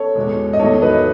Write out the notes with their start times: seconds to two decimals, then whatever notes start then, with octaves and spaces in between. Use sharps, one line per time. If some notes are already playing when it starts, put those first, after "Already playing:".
Already playing: A4 C#5
0.15 E2 B2 G#3
0.53 D#5
0.59 E2 D#3 F#3 A3 A4 C#5
0.82 B4 D#5